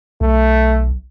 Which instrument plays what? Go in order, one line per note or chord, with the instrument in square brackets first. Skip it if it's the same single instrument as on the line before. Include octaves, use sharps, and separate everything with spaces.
[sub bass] B1 [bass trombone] A3